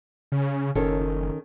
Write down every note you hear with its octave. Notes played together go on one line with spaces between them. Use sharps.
C#3
F#1 D#3 C#4 A4